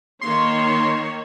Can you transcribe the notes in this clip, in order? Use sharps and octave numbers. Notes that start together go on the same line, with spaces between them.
D#3 A#3 C#5 C6